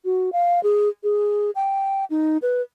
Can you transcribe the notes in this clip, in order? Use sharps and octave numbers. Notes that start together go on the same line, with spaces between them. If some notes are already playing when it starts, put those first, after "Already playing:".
F#4
F5
G#4
G#4
G5
D#4
B4